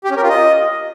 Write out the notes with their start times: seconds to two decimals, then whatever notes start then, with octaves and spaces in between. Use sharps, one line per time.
0.04 G4
0.11 C#4
0.17 A#4
0.23 F4
0.29 D#5